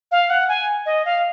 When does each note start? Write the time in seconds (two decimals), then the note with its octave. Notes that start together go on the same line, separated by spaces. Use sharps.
0.11 F5
0.30 F#5
0.49 G#5
0.86 D#5
1.05 F5